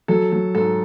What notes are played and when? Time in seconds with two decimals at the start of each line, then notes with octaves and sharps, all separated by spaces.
0.08 F#3 A4
0.32 F#3
0.55 G#2 A4